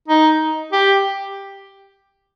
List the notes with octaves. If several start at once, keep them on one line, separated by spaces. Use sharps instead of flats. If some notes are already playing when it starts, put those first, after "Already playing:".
D#4
G4